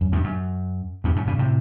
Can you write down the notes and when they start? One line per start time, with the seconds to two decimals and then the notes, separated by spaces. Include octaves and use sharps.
0.01 F#2
0.12 E2 G2
0.24 F#2
1.04 E2 G2
1.16 F#2 A2
1.27 G2 B2
1.39 A2 C3